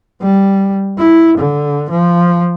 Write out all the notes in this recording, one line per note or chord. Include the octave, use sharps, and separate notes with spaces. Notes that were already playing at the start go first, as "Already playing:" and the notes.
G3
E4
D3
F3